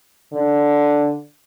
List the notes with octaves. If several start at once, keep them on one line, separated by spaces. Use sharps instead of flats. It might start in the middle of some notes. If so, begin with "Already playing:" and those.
D3